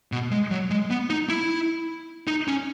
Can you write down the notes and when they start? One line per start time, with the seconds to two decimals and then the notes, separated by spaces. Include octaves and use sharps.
0.12 B2
0.31 G#3
0.51 F#3
0.70 G#3
0.90 B3
1.10 D#4
1.29 E4
2.28 D#4
2.48 C#4